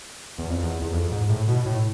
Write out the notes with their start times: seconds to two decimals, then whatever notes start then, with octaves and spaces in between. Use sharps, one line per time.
0.38 E2
0.50 F2
0.63 E2
0.82 E2
0.93 F2
1.11 G#2
1.29 A2
1.48 B2
1.66 A2